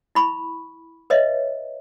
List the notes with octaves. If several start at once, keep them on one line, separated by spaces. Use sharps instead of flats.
E4 B5 C#6
B4 C#5 D#5 E5